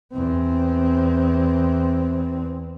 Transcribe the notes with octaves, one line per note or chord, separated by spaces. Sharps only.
E2 C4